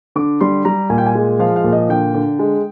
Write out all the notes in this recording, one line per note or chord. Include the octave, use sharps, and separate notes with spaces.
D3 D6
G3 C6
G3 A#5
A#2 G#5
G5
G#5
G#3
F3 F5
F5
A#2
D#5
D3 G5
D3
G#3